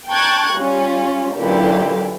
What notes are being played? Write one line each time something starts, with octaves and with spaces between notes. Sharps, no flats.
G5 A5 A#5 C#6 F#6 G#6
G3 C#4 F4
A1 A#2 D3 F#3 E4 G4